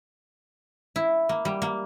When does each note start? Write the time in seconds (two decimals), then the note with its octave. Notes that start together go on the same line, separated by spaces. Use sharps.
0.96 E4
1.29 A#3
1.45 G3
1.62 A#3